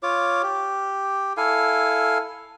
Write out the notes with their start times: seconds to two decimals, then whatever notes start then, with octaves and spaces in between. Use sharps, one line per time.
0.03 F4 C#5 D6
0.43 G4
1.37 E4 A4 F5 G#5